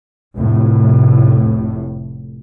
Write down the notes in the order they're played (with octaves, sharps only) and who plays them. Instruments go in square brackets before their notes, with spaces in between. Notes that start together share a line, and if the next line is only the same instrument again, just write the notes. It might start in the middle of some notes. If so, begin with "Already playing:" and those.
[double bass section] F1 A2